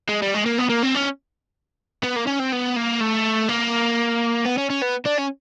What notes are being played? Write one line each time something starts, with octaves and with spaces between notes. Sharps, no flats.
G#3
G3
G#3
A#3
B3
A#3
C4
C#4
B3
A#3
C#4
C4
B3
A#3
A3
A#3
B3
C#4
C#4
B3
D4
C#4